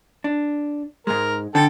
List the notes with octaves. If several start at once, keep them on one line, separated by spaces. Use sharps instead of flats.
D4
G#2 G#3 A#4
D3 A4 G5